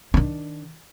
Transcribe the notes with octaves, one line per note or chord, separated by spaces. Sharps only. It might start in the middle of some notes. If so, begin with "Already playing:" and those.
D#3 D4